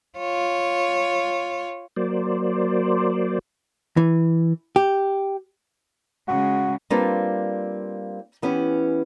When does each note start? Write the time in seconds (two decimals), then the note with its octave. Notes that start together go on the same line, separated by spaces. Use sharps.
0.18 F4 C#5
1.96 F#3 A#3 C5 D5
3.97 E3
4.76 G4
6.28 C#3 G#3 F#4
6.90 G3 A#3 C4 D4 F4 B4
8.42 E3 B3 C#4 G4